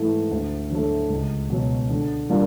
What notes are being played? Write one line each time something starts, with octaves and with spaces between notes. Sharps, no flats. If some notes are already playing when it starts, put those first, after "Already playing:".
Already playing: G#2 E3 A3
D2
D3 F#3 A3
C#2
B2 F#3
D3
G3 A#3 D4 F4